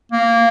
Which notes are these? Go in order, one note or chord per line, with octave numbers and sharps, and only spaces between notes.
A#3